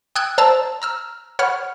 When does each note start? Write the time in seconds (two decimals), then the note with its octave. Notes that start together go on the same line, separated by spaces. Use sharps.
0.15 G5 D#6 E6 F#6 G#6 D7
0.38 C5 A5 A#5 E6 A6
0.82 A#5 E6 F6
1.39 C#5 F#5 B5 F6